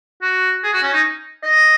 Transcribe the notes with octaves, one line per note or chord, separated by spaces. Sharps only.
F#4
G#4
F#4
C#4
D#4
D#5